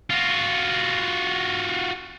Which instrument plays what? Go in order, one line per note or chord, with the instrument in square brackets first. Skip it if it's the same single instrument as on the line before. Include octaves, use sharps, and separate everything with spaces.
[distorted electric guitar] F4 F#4